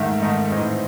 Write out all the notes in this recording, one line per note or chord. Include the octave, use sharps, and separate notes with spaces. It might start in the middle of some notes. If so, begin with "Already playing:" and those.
Already playing: G#2 D#3 A3 E5
G#2 D#3 A3 D#5
A2 E3 C4 D#4